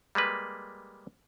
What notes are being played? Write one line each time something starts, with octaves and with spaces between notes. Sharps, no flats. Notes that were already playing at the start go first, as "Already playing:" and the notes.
G3 G#3 A#3 B4